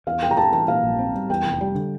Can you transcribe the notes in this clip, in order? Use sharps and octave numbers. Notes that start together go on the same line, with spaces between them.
E2 F5
F1 G5
A#5
A3 A5
E3 A5
A#2 F5
A#1
C4
G3
E2 G5
F1
G3
D3